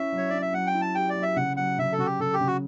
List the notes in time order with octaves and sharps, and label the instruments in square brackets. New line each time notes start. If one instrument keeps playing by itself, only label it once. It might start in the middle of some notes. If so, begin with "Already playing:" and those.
Already playing: [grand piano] C#4 E4 [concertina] E5
[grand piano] F#3
[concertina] C#5
[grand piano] C#4 [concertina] D5
[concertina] E5
[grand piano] F#3 [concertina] F#5
[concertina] G5
[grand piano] E4
[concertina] A5
[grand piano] G4 [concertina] G5
[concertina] D5
[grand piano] F#3
[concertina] E5
[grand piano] C#3 [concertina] F#5
[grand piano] F#3 [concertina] F#5
[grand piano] C#3 [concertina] E5
[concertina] A4
[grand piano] C#3 [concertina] F#4
[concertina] G4
[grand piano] C#3 [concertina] A4
[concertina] G4
[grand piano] C#3
[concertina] F#4